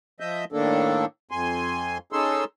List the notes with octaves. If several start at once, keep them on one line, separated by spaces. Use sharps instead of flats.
F3 D#5 E5 G6
A2 D#3 A#3 D4 A4
F2 G#5 C6
C#4 D#4 G#4 A4 C6 E6